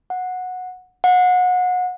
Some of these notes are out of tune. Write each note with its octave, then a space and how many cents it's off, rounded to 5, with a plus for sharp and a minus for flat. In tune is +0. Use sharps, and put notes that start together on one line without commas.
F#5 -15
F#5 -30